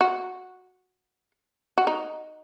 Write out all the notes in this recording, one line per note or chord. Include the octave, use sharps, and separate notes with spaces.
F#4
F#4
D#4